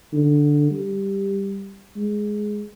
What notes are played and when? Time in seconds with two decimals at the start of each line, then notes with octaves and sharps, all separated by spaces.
0.13 D3
0.70 G3
1.96 G#3